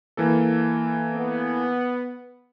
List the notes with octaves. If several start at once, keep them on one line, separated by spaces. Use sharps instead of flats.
E3 A#3 A4
B3